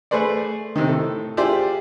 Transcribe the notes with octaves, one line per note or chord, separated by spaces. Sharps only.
A3 G#4 B4 C5 D5
C3 D#3
A2 A4
F4 G4 G#4 C5 D5 E5